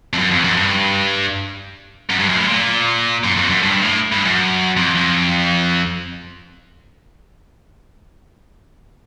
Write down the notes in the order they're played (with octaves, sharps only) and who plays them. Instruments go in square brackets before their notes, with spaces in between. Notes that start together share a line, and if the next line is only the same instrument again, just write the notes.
[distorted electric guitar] F2
F#2
F2
F#2
G2
F#2
G2
F#2
A2
A#2
F#2
F2
F#2
G2
A2
G2
F#2
F2
F2